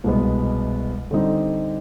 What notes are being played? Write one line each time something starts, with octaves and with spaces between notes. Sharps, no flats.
C2 B2 G#3 B3
D3 G3 C4 D#4